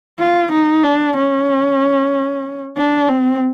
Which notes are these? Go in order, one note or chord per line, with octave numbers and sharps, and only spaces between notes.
F4
D#4
D4
C#4
D4
C4